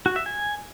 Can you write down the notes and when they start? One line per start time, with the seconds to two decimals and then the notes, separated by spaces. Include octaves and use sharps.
0.06 F#4
0.16 E5
0.26 G#5